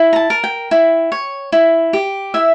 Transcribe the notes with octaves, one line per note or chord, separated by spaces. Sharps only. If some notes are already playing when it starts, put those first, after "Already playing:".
Already playing: E4
A#5
A5
A#4
G5
E4
C#5
E4
G4
E4 E5